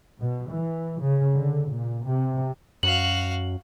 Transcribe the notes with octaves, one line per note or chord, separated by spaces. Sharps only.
B2
E3
C#3
D3
A#2
C3
F#2 F#4 F5 F#7